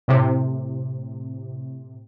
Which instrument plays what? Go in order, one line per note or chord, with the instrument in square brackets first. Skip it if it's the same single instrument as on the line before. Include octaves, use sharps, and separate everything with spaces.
[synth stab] A2 C3